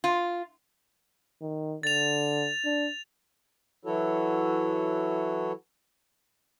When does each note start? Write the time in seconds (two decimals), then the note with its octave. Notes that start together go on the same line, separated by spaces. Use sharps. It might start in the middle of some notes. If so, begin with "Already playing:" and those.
0.04 F4
1.42 D#3
1.83 D3 A6 F7
2.65 D4
3.85 E3 F#3 E4 F#4 A4 C#5